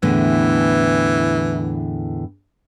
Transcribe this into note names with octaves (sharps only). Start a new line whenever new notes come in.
E2 A2 D3 E3